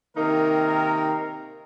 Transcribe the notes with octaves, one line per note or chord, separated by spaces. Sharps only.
C3 D#3 A#3 D#4 A#4